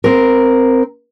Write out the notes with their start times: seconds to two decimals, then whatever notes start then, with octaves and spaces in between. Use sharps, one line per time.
0.04 C4 A#4